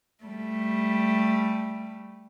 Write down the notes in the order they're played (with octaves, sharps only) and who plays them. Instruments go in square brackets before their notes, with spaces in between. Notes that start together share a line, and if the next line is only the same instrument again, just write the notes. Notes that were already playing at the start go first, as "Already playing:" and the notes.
[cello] G3 A3